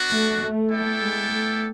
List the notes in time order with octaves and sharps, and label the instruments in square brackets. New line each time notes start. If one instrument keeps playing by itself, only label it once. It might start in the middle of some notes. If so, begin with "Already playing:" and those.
Already playing: [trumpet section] B3 D4 F#4
[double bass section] A3
A3
[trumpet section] B3 E4 A4 D5 G5
[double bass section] G#3
A3